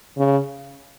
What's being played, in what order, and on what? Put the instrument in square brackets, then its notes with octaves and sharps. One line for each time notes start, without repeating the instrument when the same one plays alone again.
[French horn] C#3